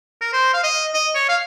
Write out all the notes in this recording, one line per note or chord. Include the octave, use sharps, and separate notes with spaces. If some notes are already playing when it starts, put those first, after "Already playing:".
A#4
C5
F5
D#5
D#5
C#5
F5